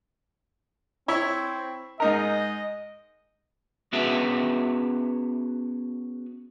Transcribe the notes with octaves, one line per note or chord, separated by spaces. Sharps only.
C4 E4 C#5
G#2 D#4 A#4 D#5
B3 C#4 F#4 G#4 B4 E5